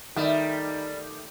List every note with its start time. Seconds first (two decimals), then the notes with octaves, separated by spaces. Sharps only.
0.17 D#3 G3 A3 D#4 E5